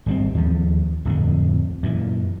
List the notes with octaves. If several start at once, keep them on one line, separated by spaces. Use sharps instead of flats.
G#1 G3 C4
D#2 F3
D1 F2 D3
F#2 A#2 E3